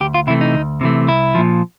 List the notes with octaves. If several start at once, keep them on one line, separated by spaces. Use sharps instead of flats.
D2 G4
F4
C3 E3 A3 E4
D#4
D2
C3 E3 A3
C2 E4
A#2 F3